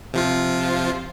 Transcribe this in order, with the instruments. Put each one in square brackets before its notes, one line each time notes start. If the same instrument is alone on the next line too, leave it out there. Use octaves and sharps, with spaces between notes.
[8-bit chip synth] C3 F3 F4